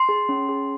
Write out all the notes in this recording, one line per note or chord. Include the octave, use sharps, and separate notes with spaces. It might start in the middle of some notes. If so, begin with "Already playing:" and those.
Already playing: C6
G#4
C#4
G#4